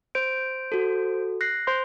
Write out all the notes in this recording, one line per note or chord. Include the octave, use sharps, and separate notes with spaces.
C5 D7
F#4 A4
F#6 A#6 C7
C5 C6